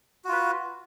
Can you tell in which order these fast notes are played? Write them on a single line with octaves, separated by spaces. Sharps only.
F#4 F4 B4